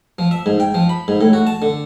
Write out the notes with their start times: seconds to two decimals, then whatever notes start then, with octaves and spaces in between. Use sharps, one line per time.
0.19 F3
0.31 E5
0.46 G#2
0.60 G5
0.74 F3
0.89 B5
1.08 G#2
1.21 A2
1.33 F#4
1.47 A5
1.62 D3